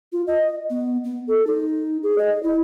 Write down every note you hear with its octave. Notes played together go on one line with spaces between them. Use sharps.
F4
D#5
B3
B3
A4
D#4
G#4
D#5
E4